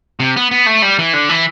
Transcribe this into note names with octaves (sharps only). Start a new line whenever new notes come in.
C3
B3
B3
A3
G3
E3
D3
E3